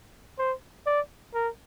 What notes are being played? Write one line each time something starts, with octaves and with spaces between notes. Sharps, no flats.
C5
D5
A#4